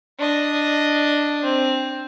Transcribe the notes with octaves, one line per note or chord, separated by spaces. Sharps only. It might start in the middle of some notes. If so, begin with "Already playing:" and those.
D4 D#5
C4